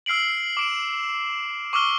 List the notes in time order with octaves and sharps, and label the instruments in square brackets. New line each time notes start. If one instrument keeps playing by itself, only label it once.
[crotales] E6 F6 C7 D7 F#7
D6 D7 E7
C#6 D6 E6 F6 G7